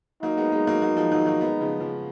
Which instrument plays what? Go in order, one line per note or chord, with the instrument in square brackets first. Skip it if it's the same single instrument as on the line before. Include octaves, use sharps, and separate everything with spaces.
[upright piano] F#3 A#3 [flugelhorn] D#4
[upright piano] G#3 B3
G#3 B3
F#3 A#3
F#3 A#3
F3 G#3
D#3 F#3
F#3 A#3
G#3 B3
C#3 F3
C#3 F3